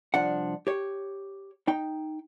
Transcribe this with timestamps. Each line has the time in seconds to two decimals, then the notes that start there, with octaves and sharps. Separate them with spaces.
0.14 C2 F3 D4 F#5
0.67 G4 C#5
1.68 D#4 G5